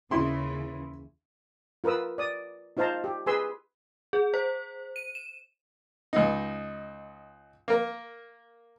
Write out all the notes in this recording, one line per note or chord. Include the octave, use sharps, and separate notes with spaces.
D#2 C#3 E3 E4 C6
F4 A#4 B4 D#6 E6
D5 D#6
D#4 F4 C5 F5 A5 A#5
G4
G#4 B4 G#5 B5 C6 E6
G#4
C5
D#7
E7
C#2 D#4
A#3 A#4